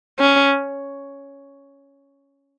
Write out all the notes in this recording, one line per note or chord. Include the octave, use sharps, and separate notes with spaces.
C#4